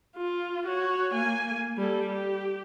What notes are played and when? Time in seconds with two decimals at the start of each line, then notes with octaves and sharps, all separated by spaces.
0.17 F4
0.66 F#4 C#5
1.14 A#3 G#5
1.77 G3 A4
2.07 G4